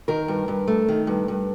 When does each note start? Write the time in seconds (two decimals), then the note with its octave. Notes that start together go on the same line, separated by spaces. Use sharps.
0.08 D#3 A#4
0.28 G2
0.48 G2
0.67 A3
0.88 D#3
1.07 G2
1.28 G2